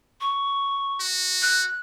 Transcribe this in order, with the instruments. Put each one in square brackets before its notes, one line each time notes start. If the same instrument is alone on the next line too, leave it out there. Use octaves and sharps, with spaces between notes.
[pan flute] C#6
[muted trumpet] F#4
[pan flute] F#6